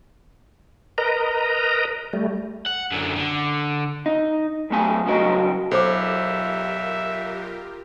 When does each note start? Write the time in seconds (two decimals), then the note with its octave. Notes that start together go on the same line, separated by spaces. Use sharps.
0.98 A#4 B4 D#5 A#5
2.13 G3 A3
2.66 F#5
2.91 F#2 D3
3.16 D3
4.06 D#4
4.70 F2 F#3 A3 G#5
5.05 C2 C#3 F#3 A#4 D#5
5.71 B1 F4 G4 A4 A#4 C5 E5 D6